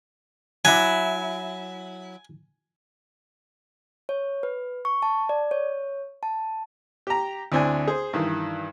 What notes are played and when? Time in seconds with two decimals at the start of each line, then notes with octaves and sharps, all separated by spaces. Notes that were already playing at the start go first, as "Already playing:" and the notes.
0.65 F#3 E4 G#5
4.09 C#5
4.43 B4
4.85 C#6
5.02 A5
5.29 D5
5.51 C#5
6.23 A5
7.07 G4 A#5
7.52 D2 C4 D4 E4 G#5
7.87 G#4 C5
8.13 G2 D#3 E3